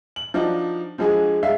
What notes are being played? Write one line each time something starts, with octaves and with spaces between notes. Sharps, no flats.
F#7
F3 D4 D#4 F#4
D3 F3 G#3 F#4 G#4
G#3 E5 F5